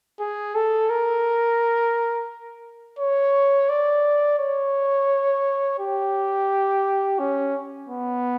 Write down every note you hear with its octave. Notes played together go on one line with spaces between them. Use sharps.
G#4
A4
A#4
C#5
D5
C#5
G4
C#4
B3